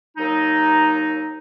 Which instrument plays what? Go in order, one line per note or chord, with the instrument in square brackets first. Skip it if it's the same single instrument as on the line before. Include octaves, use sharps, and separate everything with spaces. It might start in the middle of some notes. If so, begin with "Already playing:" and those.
[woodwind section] D#2 F#3 D#4